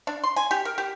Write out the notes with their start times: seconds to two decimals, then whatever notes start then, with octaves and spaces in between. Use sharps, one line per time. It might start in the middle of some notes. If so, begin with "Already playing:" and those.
0.07 D4
0.24 C6
0.36 G#5
0.51 G4
0.65 A#4
0.78 G4